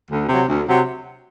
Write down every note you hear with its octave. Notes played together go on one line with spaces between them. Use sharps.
D2
C3 F#3
D2
C3 F#3